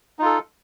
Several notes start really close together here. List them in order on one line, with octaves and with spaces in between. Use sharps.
D#4 F4 A4